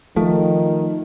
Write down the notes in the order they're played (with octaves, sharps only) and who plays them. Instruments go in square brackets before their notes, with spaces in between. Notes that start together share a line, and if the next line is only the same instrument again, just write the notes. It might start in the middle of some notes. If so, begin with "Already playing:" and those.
[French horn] D#3 [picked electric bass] F3 A3